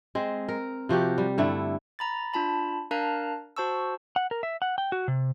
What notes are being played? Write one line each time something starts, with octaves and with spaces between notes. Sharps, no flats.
G#3 C4
A#4
C3 F3 F#4 G4
G3
G2 D3 A3 E4
A#5 B5 A6
D4 F4 A5 B5
D4 A#4 F5 A5 A#5 F#6
F#4 C5 A5 C#6 E6
F#5
A#4
E5
F#5
G5
F#4
C3